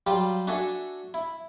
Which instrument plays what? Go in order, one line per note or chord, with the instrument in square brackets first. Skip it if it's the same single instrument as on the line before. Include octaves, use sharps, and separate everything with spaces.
[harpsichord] F#3 G3 F4 G4
D4 F#4 A4 E5 G#5 C#6
E4